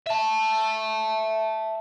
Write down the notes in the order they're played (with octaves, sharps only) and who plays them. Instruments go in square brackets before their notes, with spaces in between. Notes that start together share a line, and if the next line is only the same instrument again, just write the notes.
[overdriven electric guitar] E5 A5